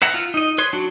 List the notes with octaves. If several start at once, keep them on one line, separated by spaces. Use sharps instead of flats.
B4 E5 F#5 A#5
F4
D#4 D#5
B4 C#5 C6
F#3 D4 F#4